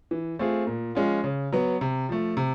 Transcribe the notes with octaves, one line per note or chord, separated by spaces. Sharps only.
E3
A3 C4 F4 G#4
A#2
F3 G#3 C#4 F4
C#3
F#3 B3
C3
F3 A3
C3